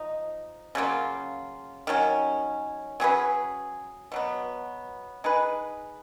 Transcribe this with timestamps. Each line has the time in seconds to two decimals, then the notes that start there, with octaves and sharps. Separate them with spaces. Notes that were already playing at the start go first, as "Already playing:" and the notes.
Already playing: F3 D#4
0.75 C#3 F#3 A#3 F4
1.87 D#3 F#3 C#4
3.00 F#3 C#4 G#4 B4
4.12 B2 F#3 B3
5.24 G#3 D#4 G#4 B4